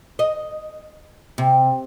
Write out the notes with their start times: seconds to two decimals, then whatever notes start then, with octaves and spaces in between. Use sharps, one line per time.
0.19 D#5
1.38 C3